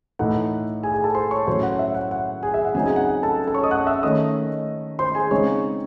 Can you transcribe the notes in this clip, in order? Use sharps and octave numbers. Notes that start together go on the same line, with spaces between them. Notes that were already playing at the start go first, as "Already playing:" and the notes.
A2 E3 A3 D#4 F#5
G#4 G#5
G#4 G#5
A4 A5
C5 C6
C#5 C#6
A2 F#3 C#4 C5 C6
F#5
E5
F#5
F#5
G#4 G#5
E5
F#5
C#3 F#3 C4 D#4 G#4 G#5
G#4 G#5
F#5
F#5
A4 A5
A4 A5
C#5 C#6
D#5 D#6
F#5 F#6
E5 E6
D#3 A3 C#4 D#5 D#6
C5 C6
G#4 G#5
C#3 G#3 C4 D#4 C#5 C#6